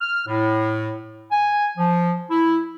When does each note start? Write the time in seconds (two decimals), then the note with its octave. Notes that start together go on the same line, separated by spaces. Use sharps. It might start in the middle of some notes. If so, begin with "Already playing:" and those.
0.01 F6
0.27 A2
1.31 G#5
1.78 F3
2.30 E4